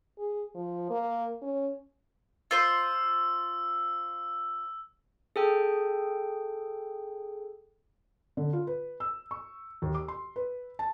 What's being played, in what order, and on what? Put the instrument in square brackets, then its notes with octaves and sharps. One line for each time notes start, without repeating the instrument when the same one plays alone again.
[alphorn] G#4
F3
A#3
C#4
[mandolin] F4 C5 C6 [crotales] E6
[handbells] G#4 A4 G5
[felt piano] D3
F4
B4
E6
C#6
D#2
D6
C6
B4
A5